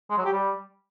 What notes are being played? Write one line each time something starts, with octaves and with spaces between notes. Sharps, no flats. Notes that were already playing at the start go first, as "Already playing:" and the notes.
G#3
F#3
G4
G3